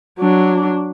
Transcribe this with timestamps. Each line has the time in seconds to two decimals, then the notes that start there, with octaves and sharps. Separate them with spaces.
0.19 F#3 D4